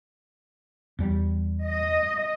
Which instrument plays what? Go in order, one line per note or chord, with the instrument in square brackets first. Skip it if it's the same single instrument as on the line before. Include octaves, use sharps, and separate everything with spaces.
[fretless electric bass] E2 G3
[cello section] D#5